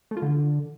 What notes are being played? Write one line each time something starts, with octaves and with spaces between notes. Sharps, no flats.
A3
F4
D3